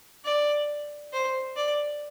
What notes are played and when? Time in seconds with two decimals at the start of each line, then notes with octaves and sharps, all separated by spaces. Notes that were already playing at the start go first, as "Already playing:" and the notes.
0.24 D5
1.13 C5
1.56 D5